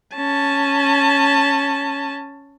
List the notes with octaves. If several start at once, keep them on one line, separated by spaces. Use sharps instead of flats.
C#4 A5